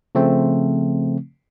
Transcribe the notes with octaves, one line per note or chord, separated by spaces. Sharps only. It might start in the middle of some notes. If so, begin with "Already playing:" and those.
C#3 F3 A3 C4